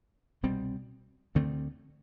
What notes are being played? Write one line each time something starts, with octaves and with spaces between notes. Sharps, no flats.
C2 B2 G3 C4
D2 D3 A3 C4